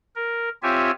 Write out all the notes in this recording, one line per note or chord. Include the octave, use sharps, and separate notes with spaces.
A#4
C4 F4 G4 C#5 E5 G#5